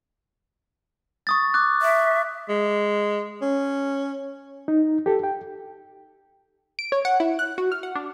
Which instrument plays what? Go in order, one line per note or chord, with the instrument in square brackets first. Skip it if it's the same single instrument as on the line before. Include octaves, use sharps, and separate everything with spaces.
[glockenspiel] C#6 D#6 A6
D6 F#6
[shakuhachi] E5
[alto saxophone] G#3
C#4
[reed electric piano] D#4
G4 A4
G5
[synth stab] D7
C#5
F#5
E4
F#6
F#4
F6
F#5
D4